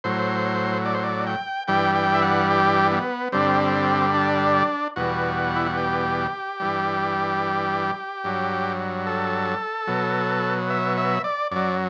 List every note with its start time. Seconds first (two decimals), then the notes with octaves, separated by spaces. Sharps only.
0.04 A2 F#3 C5
0.85 D5
0.95 C5
1.04 D5
1.27 G5
1.67 G2 E3 G3 G5
1.95 G5
2.15 E5
2.22 F#5
2.51 G4
2.92 B3
3.32 G2 D3 G3 C4
4.14 D4
4.96 E2 B2 G3 F#4
5.56 E4
5.66 F#4
5.77 G4
6.60 G2 E3 G3
8.24 G2 F#3
9.07 A4
9.87 B2 F#3
10.70 E5
10.97 E5
11.24 D5
11.51 F#2 F#3 D5